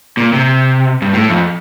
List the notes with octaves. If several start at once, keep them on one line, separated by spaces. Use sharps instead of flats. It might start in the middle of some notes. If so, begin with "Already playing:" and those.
A#2
C3
G2
A2
F2